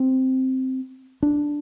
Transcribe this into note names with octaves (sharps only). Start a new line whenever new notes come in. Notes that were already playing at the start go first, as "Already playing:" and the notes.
Already playing: C4
D4